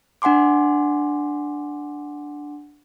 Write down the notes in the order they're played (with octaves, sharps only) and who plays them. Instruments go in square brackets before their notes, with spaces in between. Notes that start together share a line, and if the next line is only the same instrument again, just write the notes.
[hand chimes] D4 F#5 G#5 C6 D6